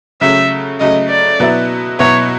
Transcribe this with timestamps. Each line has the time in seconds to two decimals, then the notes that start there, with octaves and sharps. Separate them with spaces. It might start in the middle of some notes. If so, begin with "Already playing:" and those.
0.21 C#3 F#3 A3 C#4 E5
0.80 C#3 F#3 A3 C#4 D#5
1.09 D5
1.40 B2 F#3 B3 E4
1.99 B2 F#3 B3 E4 C#5